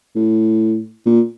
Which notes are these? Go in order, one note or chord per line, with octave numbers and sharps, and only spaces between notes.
A2
A#2